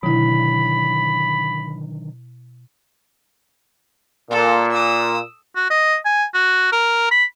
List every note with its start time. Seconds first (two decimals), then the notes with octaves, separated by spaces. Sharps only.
0.03 B2 D3 D#3 F#3 E4 B5
4.31 A#2 A#3 A4
4.71 D#6 E6
5.56 F#4
5.70 D#5
6.05 G#5
6.34 F#4
6.72 A#4
7.11 B5